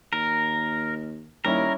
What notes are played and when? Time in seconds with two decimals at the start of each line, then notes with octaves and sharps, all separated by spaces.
0.13 D#2 A#4
1.45 D#2 G3 C#4 E4 A#4